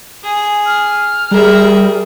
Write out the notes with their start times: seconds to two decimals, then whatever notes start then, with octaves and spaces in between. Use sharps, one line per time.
0.24 G#4
0.67 F6
1.31 G3 G#4 A#4 E5